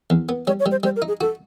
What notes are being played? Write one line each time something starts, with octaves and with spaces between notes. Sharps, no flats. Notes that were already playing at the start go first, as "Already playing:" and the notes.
E2
B3
G3 C#5
C#5
G3
C5
G3 C5
A#4
D#4
G#4
F#4 A4